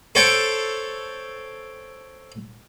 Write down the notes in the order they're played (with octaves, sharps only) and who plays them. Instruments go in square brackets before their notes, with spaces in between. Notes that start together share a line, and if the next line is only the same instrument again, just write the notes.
[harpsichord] A4 C5 C#5 G5